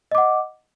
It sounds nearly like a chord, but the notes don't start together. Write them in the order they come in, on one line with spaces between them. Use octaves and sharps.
D#5 D6 F#5